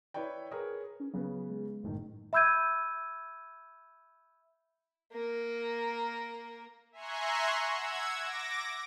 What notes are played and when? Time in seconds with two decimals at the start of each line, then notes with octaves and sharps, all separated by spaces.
0.14 E4 B4 C#5 D5 G5
0.51 G#4 A#4 B4 C#5
1.00 C#4
1.14 C#3 F#3 B3 B4
1.49 G#3
1.83 F#1 A2 D#3
2.33 E5 B5 E6 G6 G#6 D#7
5.12 A#3 A#4
6.92 E5 G#5 A#5 C6 C#6 F#6
7.67 F#5 E6 G#6
8.16 D6 A#6